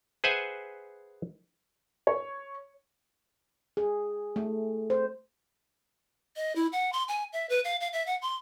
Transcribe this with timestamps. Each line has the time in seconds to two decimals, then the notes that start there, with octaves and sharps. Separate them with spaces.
0.24 G#4 B4 C5 E5 F#5 G#5
2.07 C#5
3.77 G#4
4.36 A3
4.90 C5
6.36 D#5
6.56 E4
6.72 F#5
6.93 C6
7.08 G#5
7.33 E5
7.49 B4
7.65 F5
7.80 F5
7.93 E5
8.06 F#5
8.22 C6